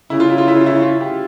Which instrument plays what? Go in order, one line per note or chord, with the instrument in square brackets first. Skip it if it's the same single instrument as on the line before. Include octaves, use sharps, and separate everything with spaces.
[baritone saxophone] C#3 [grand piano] E4
[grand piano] F4
E4
F4
E4
F4
E4
F4
G4